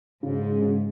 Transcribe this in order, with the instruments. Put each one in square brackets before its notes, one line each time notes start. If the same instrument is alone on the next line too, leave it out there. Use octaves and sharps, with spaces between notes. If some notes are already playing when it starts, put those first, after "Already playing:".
[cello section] G#2 [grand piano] C#3
[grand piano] G#3
C#3